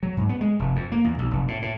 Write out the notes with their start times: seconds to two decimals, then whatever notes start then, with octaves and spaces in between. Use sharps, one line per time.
0.03 F#3
0.17 G#2
0.29 B3
0.41 G#3
0.59 F1
0.76 F2
0.92 A#3
1.04 E2
1.19 B1
1.31 F1
1.48 A2
1.62 A2